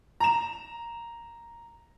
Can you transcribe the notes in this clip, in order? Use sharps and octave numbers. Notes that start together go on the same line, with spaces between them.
A#5 E7